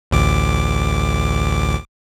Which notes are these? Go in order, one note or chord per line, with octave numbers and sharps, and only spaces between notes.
A1 D2 D6